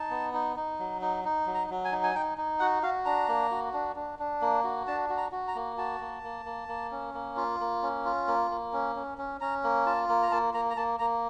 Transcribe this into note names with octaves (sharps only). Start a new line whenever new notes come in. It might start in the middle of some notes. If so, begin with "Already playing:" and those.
Already playing: D#4 A5
B3
D#4
D#4
F#3
D#4
D#4
F#3
A#5
F#3
G#5
D#4
G#5
D#4 G5
D#4
F#4 F#5
F#4 F5
D4 A#5
A#3
F#4
D4
D4
D4
A#3
F#4
D4 A5
F#4
A#5
F#4
A#5
A#3
F#4 A5
A#3
A#3
A#3
A#3
C#4
A#3
F4
A#3
C#4
F4
A#3
A#3
C#4
C#4
C#4
C#4 A#5
A#3
F4 A5
A#3
A#5
A#3 A5
A#3 A#5
A#5
A#3 A5
A#3 A#5